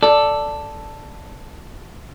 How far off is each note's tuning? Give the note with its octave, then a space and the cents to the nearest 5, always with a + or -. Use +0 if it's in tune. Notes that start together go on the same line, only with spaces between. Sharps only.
A4 +5 D5 +0